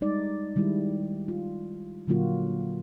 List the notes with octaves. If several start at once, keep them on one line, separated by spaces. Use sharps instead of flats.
G3 G#3 D#4 D5
D#3 G3 G#3 E4
F4
A#2 D3 F#3 A#3 F4 F#4